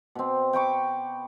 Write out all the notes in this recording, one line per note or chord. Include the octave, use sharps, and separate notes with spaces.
B2 C4
G5 B5 C#6 D6